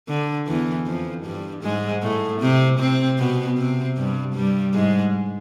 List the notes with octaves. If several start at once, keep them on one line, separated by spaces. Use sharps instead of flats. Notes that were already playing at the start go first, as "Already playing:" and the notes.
D3
E2 E3
F2 F3
G2 G3
G#2 G#3
A2 A3
C3 C4
C3 C4
B2 B3
C3 C4
G2 G3
G2 G3
G#2 G#3